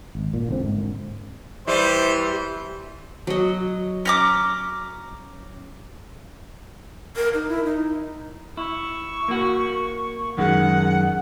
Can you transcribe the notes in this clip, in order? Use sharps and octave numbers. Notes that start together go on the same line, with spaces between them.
G#1
A#2
E1 D3 C4
G#2
E3 G3 C5
F#3 D#5
C#4 A#5 D6
A#4
D#4
E4
D#4
E4 C#6
A#3 F#4
F#2 D#3 G#3 F#5